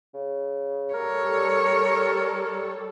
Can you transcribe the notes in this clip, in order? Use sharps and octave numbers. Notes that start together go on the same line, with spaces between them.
C#3
G3 A4 A#4 C#5